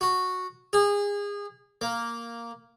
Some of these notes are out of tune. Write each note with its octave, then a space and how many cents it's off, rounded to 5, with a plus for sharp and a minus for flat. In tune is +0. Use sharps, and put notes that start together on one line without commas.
F#4 -10
G#4 -30
A#3 +0